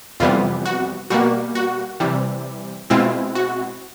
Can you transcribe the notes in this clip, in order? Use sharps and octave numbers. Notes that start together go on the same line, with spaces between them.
F2 C3 E3 G3 B3 F4
F#4
B2 G3 A#3 F#4
F#4
C3 E3 G3
B2 G#3 C4 E4 F4
F#4